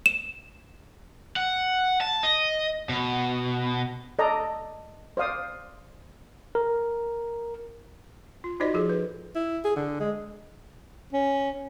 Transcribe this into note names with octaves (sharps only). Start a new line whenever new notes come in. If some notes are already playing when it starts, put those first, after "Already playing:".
E7
F#5
A5
D#5
B2
A4 D5 D#5 A#5
C5 D5 F5 D#6
A#4
F4
D#4 F4 F#4 C5 D5 D#5
F3 F4 G#4 A4
B4
E4
G#4
D3
G#3
C#4